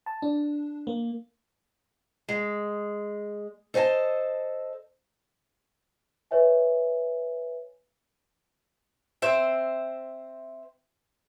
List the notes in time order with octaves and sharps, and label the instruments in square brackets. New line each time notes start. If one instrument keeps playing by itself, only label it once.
[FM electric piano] A5
D4
A#3
[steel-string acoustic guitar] G#3
A4 C5 D#5 G#5 A5
[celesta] B4 C#5 E5 G#5
[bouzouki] C4 C5 E5